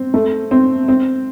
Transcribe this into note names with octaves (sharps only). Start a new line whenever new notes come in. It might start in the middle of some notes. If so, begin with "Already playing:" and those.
Already playing: C4
A3
C4
C4